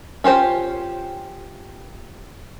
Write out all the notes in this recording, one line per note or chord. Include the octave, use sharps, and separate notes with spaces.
C#4 F4 G4 C5